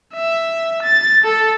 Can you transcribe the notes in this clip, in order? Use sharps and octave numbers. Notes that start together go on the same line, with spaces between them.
E5
A6
A4